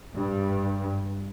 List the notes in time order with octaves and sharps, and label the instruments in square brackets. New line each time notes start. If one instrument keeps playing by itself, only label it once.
[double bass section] G2